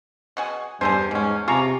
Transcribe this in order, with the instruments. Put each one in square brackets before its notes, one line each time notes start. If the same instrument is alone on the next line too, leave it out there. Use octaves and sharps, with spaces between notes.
[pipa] B2 F#4 G#4
[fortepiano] E2 [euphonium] G2 [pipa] G#4 A4 C5
[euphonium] G#2 [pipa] B2 C#4
[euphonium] C3 [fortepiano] F4 A#5 D6 [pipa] G#4 A5 C#6